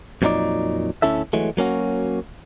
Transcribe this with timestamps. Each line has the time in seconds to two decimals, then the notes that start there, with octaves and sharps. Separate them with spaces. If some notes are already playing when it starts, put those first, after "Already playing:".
0.22 F2 A#2 F#3 A3 D#4 D5
1.02 D2 C#4 E4 A4 E5
1.33 E3 F#3 G#3 A3
1.57 F#3 A#3 C#4 F#4